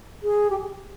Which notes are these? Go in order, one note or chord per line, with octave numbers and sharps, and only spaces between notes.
G#4
G4